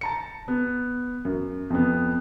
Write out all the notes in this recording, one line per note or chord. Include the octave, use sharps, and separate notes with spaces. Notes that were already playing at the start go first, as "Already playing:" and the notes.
A5 A#5 C#7
B3
F#2
F2 B3